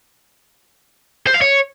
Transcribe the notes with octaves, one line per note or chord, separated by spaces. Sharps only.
C5
F5
C#5